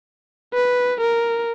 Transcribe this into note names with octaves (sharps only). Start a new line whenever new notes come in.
B4
A#4